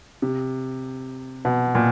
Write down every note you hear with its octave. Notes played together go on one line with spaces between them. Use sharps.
C3
B2
A#2